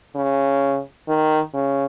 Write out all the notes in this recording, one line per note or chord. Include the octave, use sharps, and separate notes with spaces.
C#3
D#3
C#3